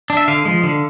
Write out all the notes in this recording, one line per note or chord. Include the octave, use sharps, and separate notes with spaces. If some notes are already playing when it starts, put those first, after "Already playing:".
D4
E5
D3 F5
F3 G#3
D3